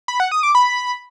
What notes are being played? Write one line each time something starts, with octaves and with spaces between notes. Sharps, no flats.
B5
F#5
D#6
D6
B5